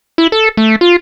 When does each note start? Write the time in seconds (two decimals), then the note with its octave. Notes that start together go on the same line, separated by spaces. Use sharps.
0.18 E4
0.32 A4
0.57 A3
0.81 F4